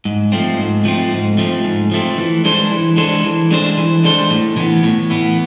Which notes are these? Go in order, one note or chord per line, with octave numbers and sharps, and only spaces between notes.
G#2
F3 A3 C4
G#2
F3 A3 C4
G#2
F3 A3 C4
G#2
F3 A3 C4
E3
G#3 D4 A4 C5
E3
G#3 D4 A4 C5
E3
G#3 D4 A4 C5
E3
G#3 D4 A4 C5
A2
E3 B3
A2
E3 B3